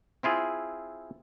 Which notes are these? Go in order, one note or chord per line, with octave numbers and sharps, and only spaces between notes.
C4 E4 F4 G#4